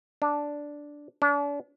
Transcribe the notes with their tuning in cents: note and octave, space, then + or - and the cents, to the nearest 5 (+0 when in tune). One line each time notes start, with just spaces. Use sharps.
D4 -5
D4 -40